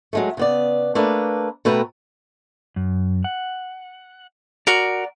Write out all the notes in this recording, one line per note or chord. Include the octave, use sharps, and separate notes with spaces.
F#3 G#3 A3
C#3 B3 D5
A3 A#3 D4 B4
B2 A3 B4 G5 A#5
F#2
F#5
F#4 A#4 D5